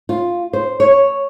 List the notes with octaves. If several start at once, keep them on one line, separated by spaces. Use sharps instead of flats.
F4
C5
C#5